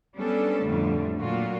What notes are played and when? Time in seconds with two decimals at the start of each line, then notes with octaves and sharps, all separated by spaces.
0.18 G3 B3 C#4 D4 A4
0.64 F2 A2 D3 G3 A3
1.21 A#2 F#3 A3 A#3 F4 F#4